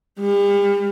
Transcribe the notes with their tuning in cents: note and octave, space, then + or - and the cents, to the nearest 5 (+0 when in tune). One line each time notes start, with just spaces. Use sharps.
G3 +40